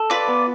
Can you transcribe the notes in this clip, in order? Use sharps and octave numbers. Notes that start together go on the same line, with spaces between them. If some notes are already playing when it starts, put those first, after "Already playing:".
Already playing: A4
F4 B4 D5
B3